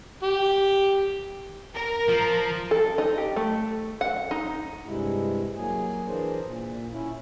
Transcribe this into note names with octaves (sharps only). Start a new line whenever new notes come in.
G4
A#4
F3
A4
D#4
G4
A3
F#5
D#4
G2 C3 G#3 E4
F#3 A#3 G#4 G#5
E3 D4 G#4 A#4 C5 D5
A#2
C#4 E4